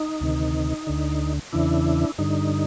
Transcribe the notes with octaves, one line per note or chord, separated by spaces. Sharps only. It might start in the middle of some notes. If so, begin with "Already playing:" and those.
Already playing: D#4
D2 C3 D#3
D2 D3
E2 C#3 E3 D4 E4
G2 D3 D#4